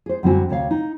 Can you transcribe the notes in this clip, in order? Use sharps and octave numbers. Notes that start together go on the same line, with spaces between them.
G#4 C5
F#2 D3 G3 C4 F#4 G#5
D2 C3 C#5 F5
D#4